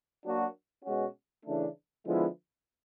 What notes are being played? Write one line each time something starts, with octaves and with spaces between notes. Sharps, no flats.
F#3 A#3 D4 F#4
B2 G#3 C#4 F#4
C#3 E3 A3 D4
D3 F3 G#3 B3 E4